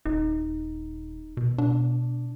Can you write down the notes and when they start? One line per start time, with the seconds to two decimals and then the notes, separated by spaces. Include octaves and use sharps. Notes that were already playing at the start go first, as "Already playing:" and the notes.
0.06 D#1 D#4
1.37 B2
1.58 B2 D4